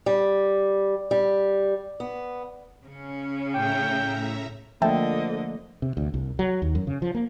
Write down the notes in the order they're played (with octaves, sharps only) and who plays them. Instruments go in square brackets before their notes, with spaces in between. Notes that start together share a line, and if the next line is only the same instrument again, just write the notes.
[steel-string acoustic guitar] G3
G3
B3
[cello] C#3 C#4
[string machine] A2 E5 A#5 [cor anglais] G5
[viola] D3 D#5 [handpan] F3 A3 A#3 [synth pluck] E5 G5 A5
[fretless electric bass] C3
D2
C2
F#3
D#2
F#2
C#3
F3
A#3